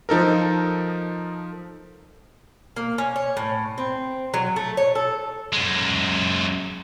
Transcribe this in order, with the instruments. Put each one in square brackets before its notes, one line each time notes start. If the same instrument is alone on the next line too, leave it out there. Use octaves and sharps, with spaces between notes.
[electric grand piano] F3 D#4 A4 A#4
[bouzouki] A#3
C#4
C#5
A2
C4
F#3
A3
C#5
A4
[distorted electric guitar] F#2 G#3